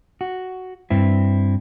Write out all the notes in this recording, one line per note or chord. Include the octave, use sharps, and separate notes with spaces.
F#4
G2 C4 E4